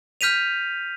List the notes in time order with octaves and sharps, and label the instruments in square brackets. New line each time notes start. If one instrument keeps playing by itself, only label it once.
[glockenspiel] F6 G6 B6 D#7 F7